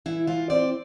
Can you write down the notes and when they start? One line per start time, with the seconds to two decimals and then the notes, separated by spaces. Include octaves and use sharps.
0.06 E3 E4
0.27 E3 F4
0.50 C4 D5